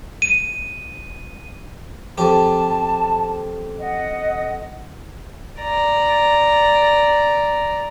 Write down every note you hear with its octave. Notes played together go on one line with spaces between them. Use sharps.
D#7
F2 G4 A5
D#5 F#5
D5 A#5